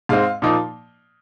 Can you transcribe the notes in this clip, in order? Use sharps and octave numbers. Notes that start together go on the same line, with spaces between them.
G#2 G#3 C4 F5
A#2 F3 A#3 D#4